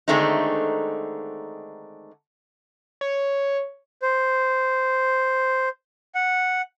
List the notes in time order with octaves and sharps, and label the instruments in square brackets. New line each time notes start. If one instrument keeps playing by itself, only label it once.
[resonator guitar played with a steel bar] D3 D#3 G#3 A3 C4 D#4
[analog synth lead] C#5
[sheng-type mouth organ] C5
F#5